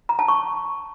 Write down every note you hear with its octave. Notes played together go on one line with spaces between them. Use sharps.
A#5
A5
C#6